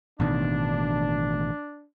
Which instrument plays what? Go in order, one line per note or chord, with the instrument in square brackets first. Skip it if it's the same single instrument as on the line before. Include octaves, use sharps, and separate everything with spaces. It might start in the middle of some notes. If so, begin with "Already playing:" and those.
[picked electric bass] A1 B2 D#3 [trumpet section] D4